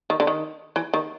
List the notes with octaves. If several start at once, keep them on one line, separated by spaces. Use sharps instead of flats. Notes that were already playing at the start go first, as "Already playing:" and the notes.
D#3
D3
D#3
E3
D#3